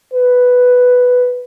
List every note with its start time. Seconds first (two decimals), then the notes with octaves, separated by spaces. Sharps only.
0.14 B4